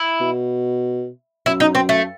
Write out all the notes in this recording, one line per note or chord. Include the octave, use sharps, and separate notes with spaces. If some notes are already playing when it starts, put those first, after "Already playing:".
Already playing: E4
B2
F#2 E4
D#4
C4
A3